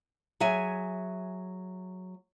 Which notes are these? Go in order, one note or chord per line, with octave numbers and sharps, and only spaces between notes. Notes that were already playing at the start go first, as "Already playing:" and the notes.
F#3 G#4 E5 G#5